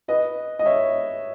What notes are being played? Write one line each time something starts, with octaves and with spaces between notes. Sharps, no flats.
B4 D#5
D#5
C#5 E5